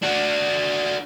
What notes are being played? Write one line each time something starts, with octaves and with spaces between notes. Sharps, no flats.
D4 F#4